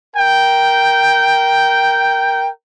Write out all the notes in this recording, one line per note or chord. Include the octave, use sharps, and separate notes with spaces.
A#4 G5